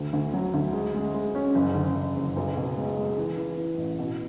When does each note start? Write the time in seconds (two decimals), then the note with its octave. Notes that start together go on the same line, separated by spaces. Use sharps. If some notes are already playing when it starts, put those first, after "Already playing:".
Already playing: D2
0.13 D2
0.33 F#3
0.54 D2
0.73 G#3
0.94 G#3
1.14 G#3
1.35 C#4
1.55 F#1
1.75 D3
1.95 F#1
2.16 F#1
2.37 B1
2.57 B2
2.77 G#3
2.97 G#3
3.18 E3
3.37 E3
3.57 E3
3.78 A1
3.99 B2